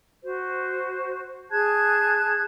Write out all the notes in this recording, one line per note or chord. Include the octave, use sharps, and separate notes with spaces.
F#4 C5
G#4 A5 F#6 G#6